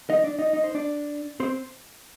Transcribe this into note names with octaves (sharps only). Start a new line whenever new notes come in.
D#4 D#5
D4 D5
D#4 D#5
D#4 D#5
C5
D4 D5
C4 C5